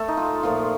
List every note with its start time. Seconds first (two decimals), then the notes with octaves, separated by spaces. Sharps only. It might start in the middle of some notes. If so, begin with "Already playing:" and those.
Already playing: A3 A4
0.08 D#4
0.17 F4
0.43 A#2 F3 A3 F4